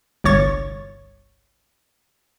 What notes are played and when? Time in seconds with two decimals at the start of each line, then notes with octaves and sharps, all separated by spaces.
0.24 G1 C2 C#5 C#6 A6